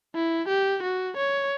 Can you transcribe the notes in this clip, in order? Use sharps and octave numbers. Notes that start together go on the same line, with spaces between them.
E4
G4
F#4
C#5